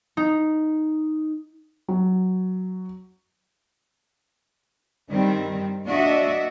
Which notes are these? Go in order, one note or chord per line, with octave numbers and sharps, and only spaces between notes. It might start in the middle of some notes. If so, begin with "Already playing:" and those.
D#4
F#3
G2 D#3 G3 C4
A#3 D4 F#4 D#5 E5